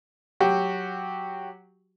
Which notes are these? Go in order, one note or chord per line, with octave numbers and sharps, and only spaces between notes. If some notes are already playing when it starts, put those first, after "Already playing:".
F#3 F#4 G4